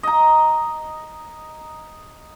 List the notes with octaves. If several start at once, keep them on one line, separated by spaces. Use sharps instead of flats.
D#5 A#5